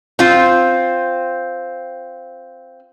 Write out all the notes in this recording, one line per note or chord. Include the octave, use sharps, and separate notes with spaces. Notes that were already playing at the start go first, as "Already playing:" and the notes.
C4 F4